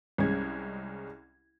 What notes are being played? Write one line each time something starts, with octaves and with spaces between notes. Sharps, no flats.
C2 G#3 C#4 G#6